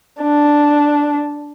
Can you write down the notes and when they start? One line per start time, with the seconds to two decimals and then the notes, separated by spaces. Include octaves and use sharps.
0.23 D4